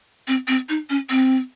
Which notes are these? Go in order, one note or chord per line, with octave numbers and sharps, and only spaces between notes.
C4
C4
D#4
C#4
C4